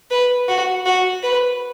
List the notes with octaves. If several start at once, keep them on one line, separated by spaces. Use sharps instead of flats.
B4
F#4
F#4
B4